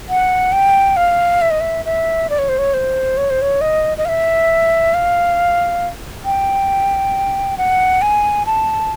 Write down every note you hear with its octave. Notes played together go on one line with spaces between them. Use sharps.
F#5
G5
F5
E5
D#5
E5
E5
D5
C#5
C5
C#5
C5
C#5
C5
C#5
D#5
D#5
F5
E5
F5
G5
F#5
G#5
A5